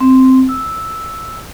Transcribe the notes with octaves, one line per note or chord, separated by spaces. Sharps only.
C4
E6